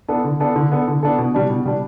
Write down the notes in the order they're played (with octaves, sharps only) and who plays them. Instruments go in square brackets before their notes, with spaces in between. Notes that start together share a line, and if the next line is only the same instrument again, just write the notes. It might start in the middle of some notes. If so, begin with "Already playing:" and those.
[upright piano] B3 D4 A4
D3
B3 D4 A4
D3
B3 D4 A4
D3
B3 D4 A4
B2
G3 D4
B2
G3 D4